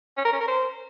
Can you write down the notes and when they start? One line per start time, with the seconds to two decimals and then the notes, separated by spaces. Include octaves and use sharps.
0.17 C#4
0.25 A#4
0.33 C#4
0.40 A#4
0.48 C5